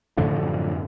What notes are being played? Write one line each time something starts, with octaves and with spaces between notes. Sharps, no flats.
F#2 A2 D3 F3